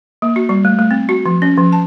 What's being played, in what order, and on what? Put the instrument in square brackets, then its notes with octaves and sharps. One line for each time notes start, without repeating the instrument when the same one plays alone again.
[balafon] A#3
F#4
G3
A3
A3
C4
F#4
F3
C#4
F3
A5